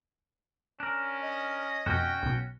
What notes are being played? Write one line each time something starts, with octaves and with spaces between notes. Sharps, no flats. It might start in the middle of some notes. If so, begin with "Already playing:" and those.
C#4 D4 A#4
D#5
F2 B2 C#4 F#4 G5
B1 B2